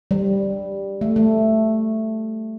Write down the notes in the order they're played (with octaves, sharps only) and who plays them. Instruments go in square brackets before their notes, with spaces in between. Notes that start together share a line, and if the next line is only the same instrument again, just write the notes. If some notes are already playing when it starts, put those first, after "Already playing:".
[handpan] G3
A3
A3